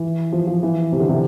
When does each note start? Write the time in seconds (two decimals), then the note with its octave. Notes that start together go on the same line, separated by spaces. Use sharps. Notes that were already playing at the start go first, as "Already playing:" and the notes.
Already playing: E3
0.32 F3
0.47 F3
0.63 E3
0.92 C3
1.00 D3
1.09 C3